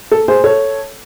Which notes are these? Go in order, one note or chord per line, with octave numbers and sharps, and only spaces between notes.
A4
G#4 C5
A4 C#5